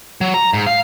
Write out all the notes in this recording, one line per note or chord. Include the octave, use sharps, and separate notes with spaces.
F#3
A#5
G#2
F5